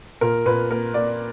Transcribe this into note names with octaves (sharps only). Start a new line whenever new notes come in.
A#2 A#4
A#2 B4
A#3 A#4
A#3 D5